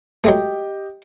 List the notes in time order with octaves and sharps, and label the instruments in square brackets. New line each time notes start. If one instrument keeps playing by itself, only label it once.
[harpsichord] F#3 G#3 A3 [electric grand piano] G4 D#5 G5